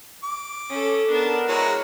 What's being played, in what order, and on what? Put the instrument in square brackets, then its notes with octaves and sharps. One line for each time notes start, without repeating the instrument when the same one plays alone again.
[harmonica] D6
[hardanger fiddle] C#4 A4 [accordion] D#6
[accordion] B3 A#4 [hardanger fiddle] D4 A5
[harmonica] G#3 F#4 A#5 [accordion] E4 G#4 A#4 [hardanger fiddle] C#5